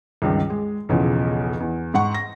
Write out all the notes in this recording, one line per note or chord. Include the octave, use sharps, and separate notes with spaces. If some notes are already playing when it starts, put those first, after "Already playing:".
C#2 G2 D#3
G#3
B1 E2 C#3 F3
E2
G#2 F#5 C#6
A#6